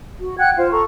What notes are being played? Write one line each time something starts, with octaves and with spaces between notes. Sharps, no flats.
F#4
F#5 G5 F#6 G#6
F4 C5 F5
A4 A#5 C#6